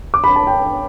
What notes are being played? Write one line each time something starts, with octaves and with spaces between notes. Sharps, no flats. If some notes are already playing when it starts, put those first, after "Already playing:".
D6
B5
A5
G5